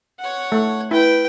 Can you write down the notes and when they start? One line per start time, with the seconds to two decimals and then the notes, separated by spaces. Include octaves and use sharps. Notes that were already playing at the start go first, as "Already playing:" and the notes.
0.19 C#5 F#5
0.52 A3
0.91 E4 B4 G5